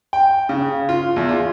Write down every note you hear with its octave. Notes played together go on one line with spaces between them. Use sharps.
G5
C#3
F4
E2
F4